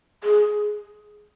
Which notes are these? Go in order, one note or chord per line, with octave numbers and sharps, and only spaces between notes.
G#4